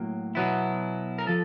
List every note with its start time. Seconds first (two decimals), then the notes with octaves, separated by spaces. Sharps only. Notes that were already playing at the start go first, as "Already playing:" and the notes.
Already playing: A2 F#3 A#3
0.35 B2 F#3 B3 E4
1.18 A#4
1.27 F3 A4